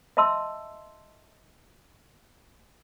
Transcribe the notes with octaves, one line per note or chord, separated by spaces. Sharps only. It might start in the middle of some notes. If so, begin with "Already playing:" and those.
D#5 E5 A5 C6 E6